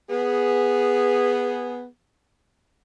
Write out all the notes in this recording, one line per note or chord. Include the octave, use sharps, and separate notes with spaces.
B3 G#4